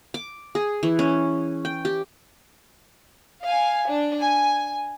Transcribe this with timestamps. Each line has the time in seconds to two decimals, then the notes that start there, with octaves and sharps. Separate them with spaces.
0.14 D6
0.55 G#4
0.83 E3
0.99 C#4
1.65 G5
1.85 G4
3.42 F5 G#5
3.87 D4
4.21 G#5